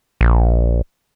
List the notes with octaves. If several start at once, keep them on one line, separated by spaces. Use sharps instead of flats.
A#1